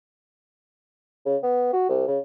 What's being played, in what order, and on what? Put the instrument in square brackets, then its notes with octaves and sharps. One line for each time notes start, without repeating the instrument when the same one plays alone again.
[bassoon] C#3
B3
F#4
C2
C#3